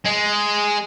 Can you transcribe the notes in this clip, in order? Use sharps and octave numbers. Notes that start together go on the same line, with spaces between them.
G#3